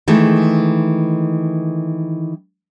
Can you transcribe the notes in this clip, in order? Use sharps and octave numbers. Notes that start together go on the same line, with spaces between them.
D#3 E3 G#3 A3